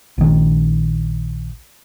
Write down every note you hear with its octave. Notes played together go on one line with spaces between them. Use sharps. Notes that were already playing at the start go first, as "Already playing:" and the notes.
A#1 D#3